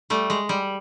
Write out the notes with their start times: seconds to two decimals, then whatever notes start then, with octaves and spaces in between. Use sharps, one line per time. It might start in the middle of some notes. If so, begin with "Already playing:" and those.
0.10 G3 A3
0.30 G#3
0.49 G3